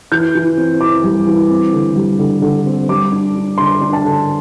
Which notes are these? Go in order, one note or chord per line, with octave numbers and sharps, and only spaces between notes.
E3 G6
E3
C4
E3 D6
G3
E3
C4
D3
G3
D3
D3
C4
G3 D6
D4
D4
D3 C6
D4
A5
D3